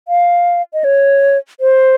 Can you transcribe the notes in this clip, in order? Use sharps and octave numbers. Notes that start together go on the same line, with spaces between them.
F5
D#5
C#5
C5